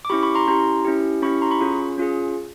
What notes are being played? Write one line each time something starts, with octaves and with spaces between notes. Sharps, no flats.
D6
C#4 E4 G4 B5 C#6
B5 C#6
A#5 C6
C#4 E4 G4 A#5 C6
C#4 E4 G4
C#4 E4 G4 B5 C#6
A#5 C6
B5 C#6
C#4 F4 G#4
C#4 F4 G#4